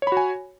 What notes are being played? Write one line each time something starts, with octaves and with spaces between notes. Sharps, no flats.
F#4 C#5 G#5 B5